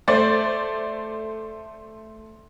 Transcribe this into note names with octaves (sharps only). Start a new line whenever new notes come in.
A3 C5 D5 A6